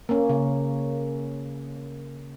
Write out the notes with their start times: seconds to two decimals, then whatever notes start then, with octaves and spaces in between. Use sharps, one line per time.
0.09 A#3 C#4
0.29 C#3